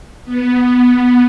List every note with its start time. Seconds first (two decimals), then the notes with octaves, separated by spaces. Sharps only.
0.25 B3